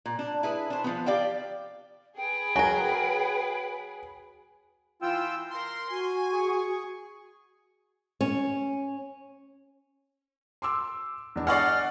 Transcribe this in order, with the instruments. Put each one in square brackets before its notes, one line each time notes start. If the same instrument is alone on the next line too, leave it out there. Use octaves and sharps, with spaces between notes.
[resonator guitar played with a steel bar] A#2
D4
E4 G#4 B4
D4 C5
F3 B3
G4 D5 F5 G5
[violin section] G#4 B4 [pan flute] G5
[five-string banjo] F#3 A#4 [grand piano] G#5
[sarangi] E3 [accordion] F4 G5 E6
[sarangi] A#4 [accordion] C6
[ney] F#4 [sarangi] G#5
[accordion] G#4 C#6
[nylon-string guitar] C#4
[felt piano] C6 D6 E6
E2 D4
[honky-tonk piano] D5 D#5 F#5 [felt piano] G#5 C#6 C7 [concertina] F6